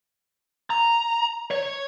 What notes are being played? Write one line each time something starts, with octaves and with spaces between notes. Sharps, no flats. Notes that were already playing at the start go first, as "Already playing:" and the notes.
A#5
C#5